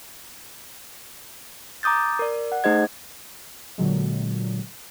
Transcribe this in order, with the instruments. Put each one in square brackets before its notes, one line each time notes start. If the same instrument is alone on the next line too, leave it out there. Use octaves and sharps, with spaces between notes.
[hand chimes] A#5 D6 D#6 G6 A6
A#4 D5
F#5
A3 D#4 G#4 C5 D#5 G#6
[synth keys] A#2 D3 F#3 G#3